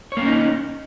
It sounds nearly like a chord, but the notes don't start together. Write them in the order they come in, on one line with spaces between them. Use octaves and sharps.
C#5 A#3 C#4 D#4